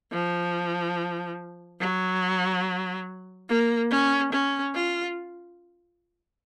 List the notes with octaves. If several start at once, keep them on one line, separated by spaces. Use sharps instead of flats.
F3
F#3
A#3
C#4
C#4
F4